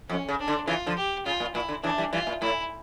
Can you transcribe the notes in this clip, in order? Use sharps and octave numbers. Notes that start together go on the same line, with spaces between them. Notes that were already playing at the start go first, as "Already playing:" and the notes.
F2 C#4
C#3
D4
D3
C#3 E3 F4
D3 F3
G4
C#3 F4
A#2
A#2 E4
D3
C#3 E3 D4
E3 G3
E3 G3 F4
A#2
A2 E4